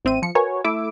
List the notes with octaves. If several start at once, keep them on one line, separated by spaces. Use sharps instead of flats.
A1 C4 E5 D#7
F3 C#7
F#4 A#4 B4 C#5 G#5
A3 E4 D6 E6 D7